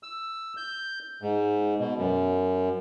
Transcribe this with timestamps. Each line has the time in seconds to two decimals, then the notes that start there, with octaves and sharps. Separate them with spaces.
0.03 E6
0.57 G6
1.22 G#2
1.79 B2
1.98 F#2